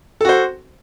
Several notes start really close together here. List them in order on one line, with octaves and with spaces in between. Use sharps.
A4 F#4 C5